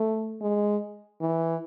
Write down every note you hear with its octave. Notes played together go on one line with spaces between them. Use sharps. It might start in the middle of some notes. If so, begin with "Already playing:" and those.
Already playing: A3
G#3
E3